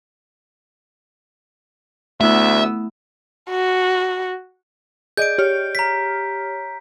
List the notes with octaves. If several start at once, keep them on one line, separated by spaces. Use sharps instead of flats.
D2 A3 B3 E4 E5 E6
F#4
G#4 D5 D#5 G6 D7
G4 C#5 F6
A#5 B6